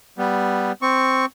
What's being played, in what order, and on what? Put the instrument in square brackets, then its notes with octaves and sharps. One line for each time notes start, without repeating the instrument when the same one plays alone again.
[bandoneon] G3 B3
C4 C#6